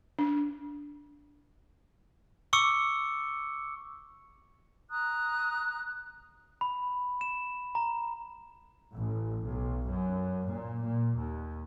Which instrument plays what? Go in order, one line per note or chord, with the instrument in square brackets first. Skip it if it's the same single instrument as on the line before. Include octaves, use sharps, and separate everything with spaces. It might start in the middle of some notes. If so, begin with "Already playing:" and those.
[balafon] D4
[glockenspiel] C#6 D6 E6 C#7
[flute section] A#5 D#6 F#6
[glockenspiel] B5
E7
A#5
[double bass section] A1
B1
F#2
A#2
A#2
D#2